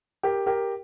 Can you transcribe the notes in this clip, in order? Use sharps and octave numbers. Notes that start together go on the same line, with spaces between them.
G4 A#4
G4 A#4